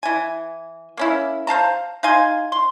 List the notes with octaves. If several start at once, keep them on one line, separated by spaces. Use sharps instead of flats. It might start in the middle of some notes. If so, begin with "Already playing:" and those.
E3 G#5
A#3 C#4 E4
C5 F5 A5 A#5
D#4 F5 G#5 C6
C6